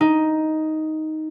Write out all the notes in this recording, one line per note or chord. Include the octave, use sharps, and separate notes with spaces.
D#4